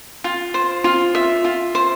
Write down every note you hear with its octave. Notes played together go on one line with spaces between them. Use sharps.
F4
C5
F4
E5
F4
C5